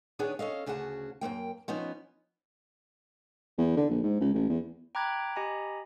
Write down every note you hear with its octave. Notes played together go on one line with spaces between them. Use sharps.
D#3 B3 D4 G#4 B4 C#5
C#4 A4 D#5 F5
D2 C#3 F#4 G#4 F#5 A5
F#2 C#3 A#3 G5
F3 B3 C#4 D#4
E2
D3
A#1
G#2
C#2
A1
E2
G5 A#5 B5 D6 F#6 G#6
G4 D#5 G#5 A#5 B5